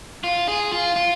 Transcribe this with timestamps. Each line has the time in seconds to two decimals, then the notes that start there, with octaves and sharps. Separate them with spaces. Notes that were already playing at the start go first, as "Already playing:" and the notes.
0.24 F4
0.48 G#4
0.73 F4
0.96 F4